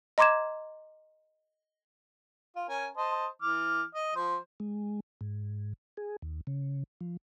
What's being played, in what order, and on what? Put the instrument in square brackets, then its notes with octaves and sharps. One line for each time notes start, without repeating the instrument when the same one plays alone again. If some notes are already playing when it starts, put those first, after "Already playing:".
[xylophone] D#5 A#5 C6 D6 G#6 E7
[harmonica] F4
C#4 A#4 G#5
C5 D#5 A5
E3 D6 F6
D#5
F3 C5
[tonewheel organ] G#3
G#2
G#4
D#2
C#3
F3